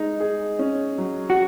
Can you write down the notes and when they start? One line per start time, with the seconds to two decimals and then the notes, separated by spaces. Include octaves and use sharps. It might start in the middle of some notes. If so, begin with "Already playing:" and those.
Already playing: G#3 D#4 G#4 D#5
0.20 G#4
0.59 C#4
0.98 F#3
1.30 F#4